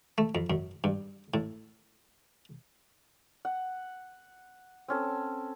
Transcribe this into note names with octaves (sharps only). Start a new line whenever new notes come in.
A3
F2
F#2
G2
A2
F#5
C4 C#4 A4